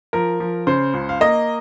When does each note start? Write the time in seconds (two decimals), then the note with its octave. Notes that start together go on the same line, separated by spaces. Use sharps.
0.13 F3 A#4
0.40 F3
0.67 C#3 C5
0.94 C#2
1.09 F5
1.21 A#3 D#5